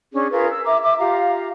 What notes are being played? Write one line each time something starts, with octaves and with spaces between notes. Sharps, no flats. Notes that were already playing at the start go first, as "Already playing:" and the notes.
C#4 D4 G#4
F4 G#4 A#4 B4
E6
E5 A#5 D6
E5 D6
F4 G4 F5 A#5